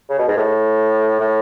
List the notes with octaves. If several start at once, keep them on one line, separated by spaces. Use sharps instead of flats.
C#3
B2
G#2
A2
A2